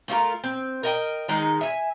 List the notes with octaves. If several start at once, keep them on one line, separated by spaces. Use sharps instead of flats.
A3 F4 F#4 A#4
C4
A#4 D#5 G5
D#3 G#3 D#4
E5 G#5